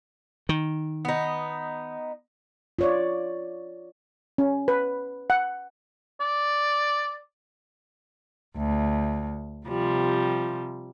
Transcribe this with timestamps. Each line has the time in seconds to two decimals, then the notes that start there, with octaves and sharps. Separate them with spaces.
0.49 D#3
1.05 B3 D#4
2.79 F4 C#5 D5
4.38 C#4
4.68 B4
5.30 F#5
6.21 D5
8.56 D2
9.67 C3 F3 G3